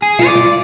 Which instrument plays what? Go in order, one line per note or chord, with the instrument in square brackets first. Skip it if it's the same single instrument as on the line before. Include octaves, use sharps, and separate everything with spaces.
[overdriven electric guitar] G#4
[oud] F4
[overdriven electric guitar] D5
[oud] F4